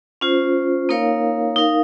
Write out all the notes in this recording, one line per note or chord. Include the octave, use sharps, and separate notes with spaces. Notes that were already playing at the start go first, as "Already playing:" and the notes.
C#4 F4 C5
A#3 D#4 A#4 C#5 F5
D#4 A#4 F5